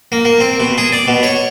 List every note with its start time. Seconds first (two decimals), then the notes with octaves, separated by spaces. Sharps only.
0.12 A#3
0.25 A#3
0.40 C4
0.60 B2
0.78 G#4
0.92 D5
1.08 B2
1.23 C#5